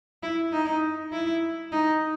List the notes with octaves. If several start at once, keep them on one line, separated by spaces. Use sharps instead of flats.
E4
D#4
E4
D#4